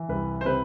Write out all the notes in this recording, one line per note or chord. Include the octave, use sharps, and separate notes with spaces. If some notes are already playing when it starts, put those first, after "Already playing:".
Already playing: E3
C2 B4
C5
C3 B4